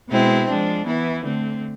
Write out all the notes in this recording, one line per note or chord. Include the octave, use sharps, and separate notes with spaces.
B2 G#3 C4 E4
F3 G#3 D4
E3 B3 E4
D3 A3 C4